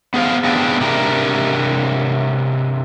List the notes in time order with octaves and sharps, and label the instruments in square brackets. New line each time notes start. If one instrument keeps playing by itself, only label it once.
[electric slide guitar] B3 G#4 C5 F5
B3 C4 D4 G4 G#4
C3 D4 G4 A#4